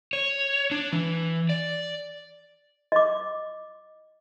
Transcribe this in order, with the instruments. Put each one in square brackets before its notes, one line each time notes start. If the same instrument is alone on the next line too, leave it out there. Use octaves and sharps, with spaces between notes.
[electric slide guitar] C#5
D4
E3
D5
[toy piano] D#5 D6